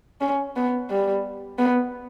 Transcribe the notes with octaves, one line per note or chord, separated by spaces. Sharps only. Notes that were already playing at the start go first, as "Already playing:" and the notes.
C#4
B3
G3
B3